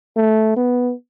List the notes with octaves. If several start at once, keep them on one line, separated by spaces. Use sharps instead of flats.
A3
B3